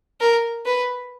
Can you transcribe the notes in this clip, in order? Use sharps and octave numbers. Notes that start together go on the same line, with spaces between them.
A#4
B4